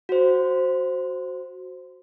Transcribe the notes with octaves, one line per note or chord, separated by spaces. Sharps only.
F#4 C5